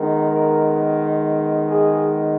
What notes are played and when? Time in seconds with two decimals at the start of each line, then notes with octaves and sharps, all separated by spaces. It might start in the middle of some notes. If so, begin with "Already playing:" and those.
Already playing: D#3 G#3 B3 A#4
0.30 A#4
1.68 G#4